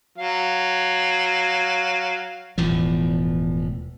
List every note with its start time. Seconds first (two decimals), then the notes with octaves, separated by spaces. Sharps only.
0.18 F#3 F5
2.58 E1 E2 A2 F3